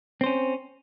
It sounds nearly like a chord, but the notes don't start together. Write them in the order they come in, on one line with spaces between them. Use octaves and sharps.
C4 C5 C#4